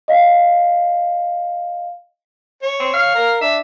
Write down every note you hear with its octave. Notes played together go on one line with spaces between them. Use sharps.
D#5 F5
C#5
C4
F5
A#4
D4 E5